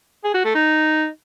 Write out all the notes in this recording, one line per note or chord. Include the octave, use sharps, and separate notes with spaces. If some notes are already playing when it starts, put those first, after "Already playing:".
G#4
F#4
A3
D#4